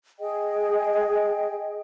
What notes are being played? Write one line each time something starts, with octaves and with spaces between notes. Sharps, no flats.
G#4 D#5 G5